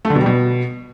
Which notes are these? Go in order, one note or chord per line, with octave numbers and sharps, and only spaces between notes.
A3
D3
B2
G3
B2